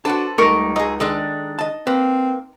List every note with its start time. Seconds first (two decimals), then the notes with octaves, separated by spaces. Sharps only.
0.05 D4 F#4 A4 B4 C5 F#5 A5
0.38 C#2 G3 A3 D#4 G4 A#4 C#6
0.76 F#3 G#4 D#5 A#5 C6
1.00 D#3 G#3 D4 A4
1.59 D#5 A5
1.87 A#3 C4 B4